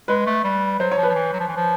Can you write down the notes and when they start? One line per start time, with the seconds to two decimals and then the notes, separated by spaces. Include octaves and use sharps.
0.08 G#3 B4
0.27 A3
0.44 G3
0.79 F#3 C5
0.92 C#5
0.98 F3
1.03 B4
1.09 F3
1.15 E3
1.33 F#3
1.40 F3
1.48 E3
1.56 F3